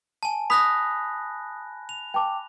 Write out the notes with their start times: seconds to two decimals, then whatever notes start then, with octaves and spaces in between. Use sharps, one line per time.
0.23 G#5 A5
0.50 B5 D#6 F#6 A#6 B6
1.89 F7
2.14 G5 A5 D6